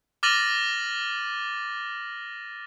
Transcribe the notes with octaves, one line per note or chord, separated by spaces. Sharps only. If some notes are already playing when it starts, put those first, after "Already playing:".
D6 F6 A6 A#6 D#7 F#7